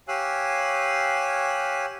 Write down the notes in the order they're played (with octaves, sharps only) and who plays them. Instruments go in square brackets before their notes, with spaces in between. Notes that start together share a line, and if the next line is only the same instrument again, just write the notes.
[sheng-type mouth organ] G4 C#5 F5 G#5 E6 F#6